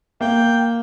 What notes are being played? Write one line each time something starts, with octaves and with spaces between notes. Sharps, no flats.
A#3 G5